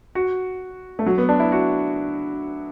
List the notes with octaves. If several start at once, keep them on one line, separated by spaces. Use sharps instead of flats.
F#4
A3
F#3
B3
D4
E4
F#4